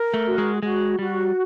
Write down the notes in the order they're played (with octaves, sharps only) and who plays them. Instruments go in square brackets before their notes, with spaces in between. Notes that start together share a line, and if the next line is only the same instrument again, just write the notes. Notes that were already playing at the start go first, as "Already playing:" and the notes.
Already playing: [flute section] A#4
[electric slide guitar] A3
[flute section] F#4
[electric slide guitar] G#3
[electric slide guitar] G#3 [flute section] F#4
[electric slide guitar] G3 [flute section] F#4